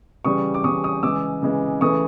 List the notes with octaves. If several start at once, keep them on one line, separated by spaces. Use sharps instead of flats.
C#3 E3 G3 C#6 D#6
D6
C#3 E3 G3 C#6 D#6
C#6 D#6
C#3 E3 G#3 D6 E6
C#3 E3 G#3
C#3 E3 A3 C#6 D#6